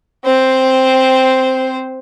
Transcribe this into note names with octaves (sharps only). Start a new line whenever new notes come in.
C4 C5